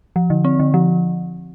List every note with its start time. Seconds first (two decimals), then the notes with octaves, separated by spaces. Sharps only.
0.16 F3
0.30 D3
0.45 C4
0.60 D3
0.74 F3